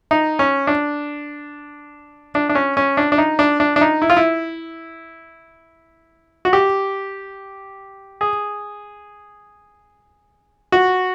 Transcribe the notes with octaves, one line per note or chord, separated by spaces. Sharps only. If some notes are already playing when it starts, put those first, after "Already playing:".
D#4
C#4
D4
D4
D4
C#4
C#4
D4
D4
D#4
D4
D4
D4
D#4
E4
F4
E4
F#4
G4
G#4
F#4